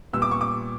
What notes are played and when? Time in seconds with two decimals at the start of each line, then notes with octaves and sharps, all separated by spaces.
0.13 A#2 G3 B3 E6
0.22 D6
0.31 C#6
0.41 D6